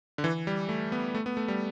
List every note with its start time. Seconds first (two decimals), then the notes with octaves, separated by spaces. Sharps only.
0.18 D3
0.24 E3
0.47 G3
0.69 A3
0.92 B3
1.15 A3
1.26 B3
1.37 A3
1.48 G3